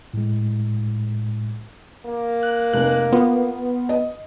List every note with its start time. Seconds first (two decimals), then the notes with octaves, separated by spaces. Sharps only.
0.14 A2 G#3
2.06 A#3
2.43 F#6
2.73 F1 F#6
3.12 B3 F4
3.89 D#5